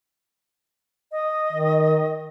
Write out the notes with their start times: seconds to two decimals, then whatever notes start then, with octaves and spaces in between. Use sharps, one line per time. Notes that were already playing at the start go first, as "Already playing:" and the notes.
1.12 D#5
1.53 D#3